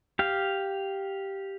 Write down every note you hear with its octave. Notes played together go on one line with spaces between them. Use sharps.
G4 F5